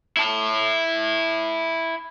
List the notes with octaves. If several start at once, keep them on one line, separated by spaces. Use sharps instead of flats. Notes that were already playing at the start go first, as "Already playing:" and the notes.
E4 A5